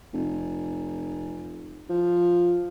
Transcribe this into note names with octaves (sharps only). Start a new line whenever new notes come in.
F1
F3